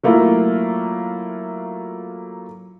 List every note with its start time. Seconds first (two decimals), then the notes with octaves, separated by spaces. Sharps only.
0.03 F#3 A3 A#3 E4 F4